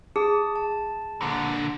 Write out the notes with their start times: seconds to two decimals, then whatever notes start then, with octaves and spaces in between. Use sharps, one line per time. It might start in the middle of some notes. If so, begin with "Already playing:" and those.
0.16 G#4 A5 D#6
0.56 A5
1.21 A#2 D3